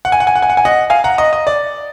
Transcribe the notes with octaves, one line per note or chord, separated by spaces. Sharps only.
F#5
G#5
F#5
G#5
F#5
G#5
F#5
G#5
D#5 F#5
F5 G#5
F#5 A#5
D#5
D#5
D5